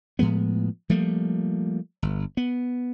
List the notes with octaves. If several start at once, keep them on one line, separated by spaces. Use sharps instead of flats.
A2 F3 G#3 B3
F3 G3 A3 A#3
G1
B3